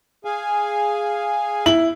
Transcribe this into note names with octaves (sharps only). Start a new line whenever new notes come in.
G#4 F5 G#5
E4 F#7